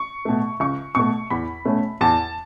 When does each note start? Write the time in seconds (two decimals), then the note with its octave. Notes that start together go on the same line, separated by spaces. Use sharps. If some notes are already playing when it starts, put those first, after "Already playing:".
Already playing: C#6
0.25 B2 A3
0.60 C#2 C#6
0.95 B2 A3 C#6
1.30 E2 B5
1.65 B2 A3 C#4
2.01 E2 A5